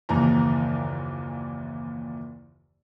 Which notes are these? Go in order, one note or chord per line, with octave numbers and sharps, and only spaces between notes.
F#1 D#2 A#2 E3 A#5